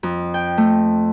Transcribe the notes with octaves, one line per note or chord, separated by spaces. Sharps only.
F2
G5
A3